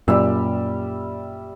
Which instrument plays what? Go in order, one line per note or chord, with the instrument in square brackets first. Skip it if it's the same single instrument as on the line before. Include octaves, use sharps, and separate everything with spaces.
[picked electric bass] F#2 A#2 [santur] G3 E5